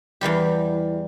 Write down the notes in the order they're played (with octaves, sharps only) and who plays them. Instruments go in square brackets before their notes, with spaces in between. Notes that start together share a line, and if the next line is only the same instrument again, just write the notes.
[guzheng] E2 E3 G3 G4